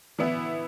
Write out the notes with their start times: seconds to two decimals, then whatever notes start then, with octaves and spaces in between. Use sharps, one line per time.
0.19 E3 B3 E4